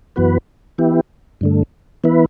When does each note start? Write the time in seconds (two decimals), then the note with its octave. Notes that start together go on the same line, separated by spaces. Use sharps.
0.16 F#2 E3 B3 F#4 B4
0.78 E3 B3 E4 G4
1.41 G2 D3 A3
2.04 E3 B3 E4 B4